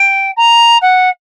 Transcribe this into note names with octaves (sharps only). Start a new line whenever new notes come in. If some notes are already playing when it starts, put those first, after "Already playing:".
Already playing: G5
A#5
F#5